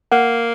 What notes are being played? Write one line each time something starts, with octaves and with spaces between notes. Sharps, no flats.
A#3 F#5